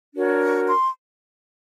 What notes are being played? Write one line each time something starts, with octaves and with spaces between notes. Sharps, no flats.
D4 F#4 A#4 C#5
C#6
C6